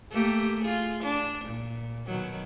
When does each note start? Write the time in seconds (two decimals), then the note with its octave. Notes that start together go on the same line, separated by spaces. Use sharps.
0.11 A3 A#3 G4
0.63 F4 G#4
1.03 D4
1.45 A#2
2.07 B2 D#3 F#3